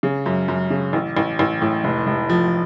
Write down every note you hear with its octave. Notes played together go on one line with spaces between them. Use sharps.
C#3
F#2
F#2
C#3
A1
A1
A1
A2
F1
F1
F3